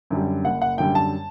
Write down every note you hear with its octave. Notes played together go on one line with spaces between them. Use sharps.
F#2 D3 G3
F#1 F#5
F#5
F#2 D3 G3 G5
A5